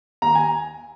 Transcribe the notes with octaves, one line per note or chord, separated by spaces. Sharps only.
D#2 A#5
G#5